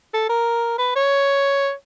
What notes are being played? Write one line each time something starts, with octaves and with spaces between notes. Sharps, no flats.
A4
A#4
B4
C#5